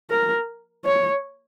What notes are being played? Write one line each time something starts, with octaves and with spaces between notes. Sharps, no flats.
A#4
C#5